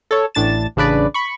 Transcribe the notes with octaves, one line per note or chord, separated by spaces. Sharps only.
A4 C#5
A1 A2 D4 A6 E7
A1 C#3 D4 B4 D5
B5 C#6